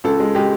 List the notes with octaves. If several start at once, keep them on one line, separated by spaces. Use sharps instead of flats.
C#2 A4
G#3
G#3 G4